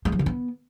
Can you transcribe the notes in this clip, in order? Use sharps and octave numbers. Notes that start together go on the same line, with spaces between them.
G#3
F3
D3
B3